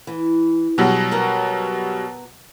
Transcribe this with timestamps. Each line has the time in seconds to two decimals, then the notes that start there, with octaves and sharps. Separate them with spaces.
0.07 E3
0.78 B2 F#3 G3 G#4
1.11 B3 F#4 A#4